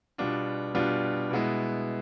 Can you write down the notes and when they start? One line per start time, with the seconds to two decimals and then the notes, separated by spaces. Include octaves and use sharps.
0.18 B2 G3 B3 D4 F4
0.75 B2 G3 B3 D4 F4
1.31 B2 G#3 B3 E4